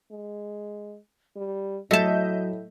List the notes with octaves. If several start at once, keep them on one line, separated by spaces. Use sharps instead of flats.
G#3
G3
A2 F#3 A3 D#5 E5 A5 G6